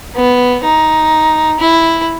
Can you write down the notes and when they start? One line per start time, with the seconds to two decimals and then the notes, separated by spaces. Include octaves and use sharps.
0.16 B3
0.64 D#4
1.60 E4